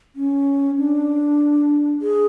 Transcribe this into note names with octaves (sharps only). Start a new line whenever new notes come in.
C#4
D4
G#4